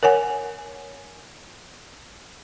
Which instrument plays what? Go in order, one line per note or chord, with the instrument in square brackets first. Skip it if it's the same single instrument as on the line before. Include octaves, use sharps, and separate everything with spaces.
[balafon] A#4 C#5 F#5 G#5